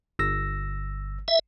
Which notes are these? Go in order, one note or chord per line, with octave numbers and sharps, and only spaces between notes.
G1 E6 A#6
E5